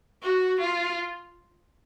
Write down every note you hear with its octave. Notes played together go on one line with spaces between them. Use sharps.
F#4
F4